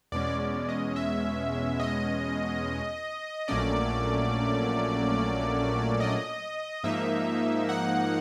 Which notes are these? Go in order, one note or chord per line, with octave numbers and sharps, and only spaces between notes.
E2 B2 G#3 C#4 D5
D5
D#5
E5
D#5
A#1 A#2 F#3 A3 C#4 D5
D#5
G#2 F3 A#3 D#4 E5
F#5